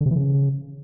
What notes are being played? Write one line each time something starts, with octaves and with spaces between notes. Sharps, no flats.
D3
C3
E3
C#3